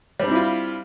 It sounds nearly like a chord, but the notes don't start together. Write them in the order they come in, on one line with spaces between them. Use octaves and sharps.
G3 D4 C4 E4 F4